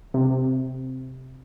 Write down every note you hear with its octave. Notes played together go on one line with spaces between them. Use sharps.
C3